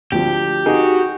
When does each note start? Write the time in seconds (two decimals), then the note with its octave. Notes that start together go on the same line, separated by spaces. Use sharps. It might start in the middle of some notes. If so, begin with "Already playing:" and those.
0.12 D2 F3 G4
0.66 D#4 F#4 G#4